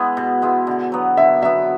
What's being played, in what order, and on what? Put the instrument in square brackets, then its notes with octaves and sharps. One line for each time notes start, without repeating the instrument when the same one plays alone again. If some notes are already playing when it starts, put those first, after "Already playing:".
Already playing: [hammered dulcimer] G#3 B3 E4
B2
G#3 B3 E4
D3
F#3 B3
[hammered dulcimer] D3 [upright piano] E5
[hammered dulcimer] F#3 B3 [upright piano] E5